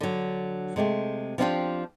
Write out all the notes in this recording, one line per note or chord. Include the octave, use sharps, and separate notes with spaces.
D3 F#3
C3 G#3 A3 G4
F3 C4 D4 D#4 F4 G4